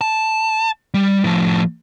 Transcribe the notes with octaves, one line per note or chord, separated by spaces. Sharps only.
A5
G3
A2 F3